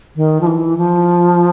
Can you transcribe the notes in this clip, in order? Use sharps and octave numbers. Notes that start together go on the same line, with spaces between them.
D#3
F3
E3
F3